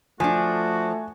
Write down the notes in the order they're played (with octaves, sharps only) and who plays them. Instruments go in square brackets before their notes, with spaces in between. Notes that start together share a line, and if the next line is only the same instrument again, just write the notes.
[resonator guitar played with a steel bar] F3 D4 [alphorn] A3 [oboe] F#4 [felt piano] G#5